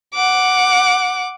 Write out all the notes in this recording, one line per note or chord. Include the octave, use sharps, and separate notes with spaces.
F#5 D6